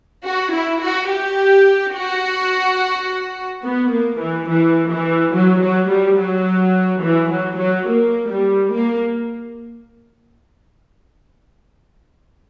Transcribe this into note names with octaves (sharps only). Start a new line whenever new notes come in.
F#4
E4
F#4
G4
F#4
B3
A#3
E3
E3
E3
F#3
F#3
G3
F#3
E3
F#3
F#3
A#3
G3
A#3